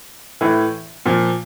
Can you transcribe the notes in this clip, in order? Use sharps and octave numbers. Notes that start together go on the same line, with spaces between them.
A2 E3
A#2 F3